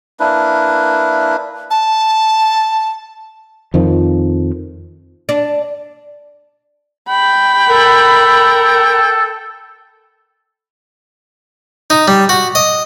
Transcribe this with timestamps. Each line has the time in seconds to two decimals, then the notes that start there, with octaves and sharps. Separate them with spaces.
0.20 A#3 D4 E4 B4
1.70 A5
3.74 F2 D#3 F3
5.29 D4
7.09 G5 B5
7.69 A4 A#4
11.90 D#4
12.08 G3
12.29 F#4
12.55 D#5